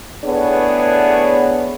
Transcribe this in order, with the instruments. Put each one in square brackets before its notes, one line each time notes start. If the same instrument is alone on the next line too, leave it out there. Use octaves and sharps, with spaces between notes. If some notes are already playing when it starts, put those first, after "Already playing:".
[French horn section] A2 B3 D4 G#4 B4 C#5